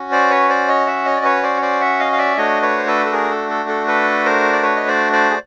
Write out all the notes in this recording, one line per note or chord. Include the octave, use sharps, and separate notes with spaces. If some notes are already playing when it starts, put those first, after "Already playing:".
Already playing: C#4 F#4
C5 D5
B4 C#5
C5 D5
C#5 D#5
E5 F#5
C#5 D#5
D5
B4 C#5
C5 D5
C#5
C5 D5
E5 F#5
D#5 F5
F5
D5 E5
A3 D4 F#4 C#5 D#5
B4 C#5
C5
A4 B4
A4
G#4 A#4
A4
A4
A4
A4 B4
A#4 C5
D5
B4 C#5
D#5
C5 D5
C5 D5
G#4